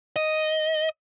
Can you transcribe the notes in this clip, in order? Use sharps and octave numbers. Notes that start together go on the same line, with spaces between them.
D#5